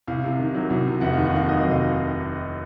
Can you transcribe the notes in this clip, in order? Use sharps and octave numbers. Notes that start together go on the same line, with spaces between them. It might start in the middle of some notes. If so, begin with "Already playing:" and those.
C2 F5
C3
D#3
F#3
C2
C3
F1 F#5
D#2 F5
F#5
D#3 F5
F#3 D#5
F1
F5